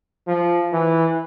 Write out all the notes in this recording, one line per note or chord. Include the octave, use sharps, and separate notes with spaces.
F3
E3